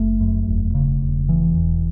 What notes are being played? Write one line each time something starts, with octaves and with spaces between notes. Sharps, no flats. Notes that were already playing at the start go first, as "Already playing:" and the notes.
Already playing: F#1 A3
F#2
E1
C#3
E1
E2 E3
E1